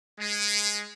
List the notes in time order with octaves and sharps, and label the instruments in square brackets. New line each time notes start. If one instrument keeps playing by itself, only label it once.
[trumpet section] G#3